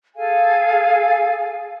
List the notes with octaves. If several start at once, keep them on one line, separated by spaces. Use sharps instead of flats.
G#4 A4 F5 G#5